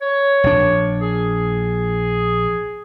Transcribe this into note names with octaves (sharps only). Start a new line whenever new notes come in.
C#5
A#1 D4
G#4